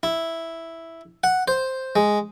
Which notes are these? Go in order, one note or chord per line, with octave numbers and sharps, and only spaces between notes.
E4
F#5
C5
G#3